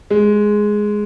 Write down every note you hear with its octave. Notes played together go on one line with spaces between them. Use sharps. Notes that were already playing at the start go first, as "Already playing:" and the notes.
G#3